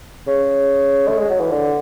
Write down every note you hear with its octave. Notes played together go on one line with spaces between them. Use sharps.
C#3
A3
G#3
F#3
E3
D3